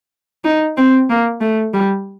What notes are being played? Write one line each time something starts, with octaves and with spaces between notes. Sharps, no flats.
D#4
C4
A#3
A3
G3